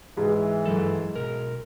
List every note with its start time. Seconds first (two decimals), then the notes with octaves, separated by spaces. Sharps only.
0.17 G#2 E3
0.66 G2 F#3 A4
1.15 B1 A#4